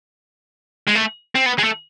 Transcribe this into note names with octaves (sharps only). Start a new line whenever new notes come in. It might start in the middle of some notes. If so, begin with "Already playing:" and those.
G#3
A3
C4
B3
G#3
A3